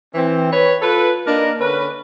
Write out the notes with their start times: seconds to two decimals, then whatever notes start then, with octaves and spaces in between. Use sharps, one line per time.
0.14 E3 C4
0.52 B4 C#5
0.82 F4 A4 B4
1.26 A#3 D4 D#4 A#4
1.59 D3 C#4 B4